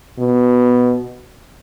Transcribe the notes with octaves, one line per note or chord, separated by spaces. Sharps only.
B2